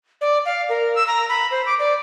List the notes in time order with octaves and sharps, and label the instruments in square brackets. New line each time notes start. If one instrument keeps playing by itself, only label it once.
[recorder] D5
F5
A#4
E6
A#5
B5
C5
D6
D5